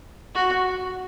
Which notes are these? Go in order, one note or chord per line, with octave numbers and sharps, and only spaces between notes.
F#4